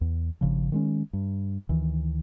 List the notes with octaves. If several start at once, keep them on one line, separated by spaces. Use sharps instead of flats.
E2
G#1 C#3 F3
D#3 G#3 C#4
G2
D2 D#3 E3